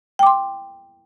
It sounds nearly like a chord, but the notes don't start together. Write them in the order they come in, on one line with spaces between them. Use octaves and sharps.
G5 D6 C6